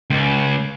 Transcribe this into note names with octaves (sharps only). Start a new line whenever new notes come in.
C#2